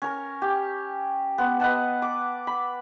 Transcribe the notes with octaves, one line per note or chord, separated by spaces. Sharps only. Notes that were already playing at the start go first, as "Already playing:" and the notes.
C#4 A#4
G4
B3 C6
B4 D#5 F#5 A5
D6
B5